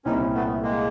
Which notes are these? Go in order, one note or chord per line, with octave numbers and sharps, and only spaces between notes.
C2 A#2 G3 C4 C#4 D#4 E4
A3 B3
G#3 A#3